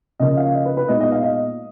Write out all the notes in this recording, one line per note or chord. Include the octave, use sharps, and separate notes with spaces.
C#3 F3 A#3 C#4 D#5
F5
D#5
B4
B4
A#2 G#3 B3 D#4 D#5
D#5
F5
D#5